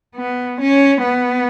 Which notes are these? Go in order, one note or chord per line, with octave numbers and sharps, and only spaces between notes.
B3
C#4
B3